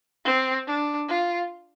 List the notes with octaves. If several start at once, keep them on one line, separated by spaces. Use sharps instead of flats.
C4
D4
F4